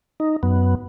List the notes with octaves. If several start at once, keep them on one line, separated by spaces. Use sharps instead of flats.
D#4
F#2 B3